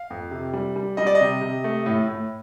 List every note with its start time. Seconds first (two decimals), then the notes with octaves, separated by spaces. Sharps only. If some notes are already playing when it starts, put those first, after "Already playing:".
Already playing: F5
0.10 F2
0.31 C3
0.53 G3
0.76 G3
0.97 G3 D#5
1.07 D5
1.15 D#5
1.20 C3
1.41 C3
1.64 A3
1.86 A2
2.08 A2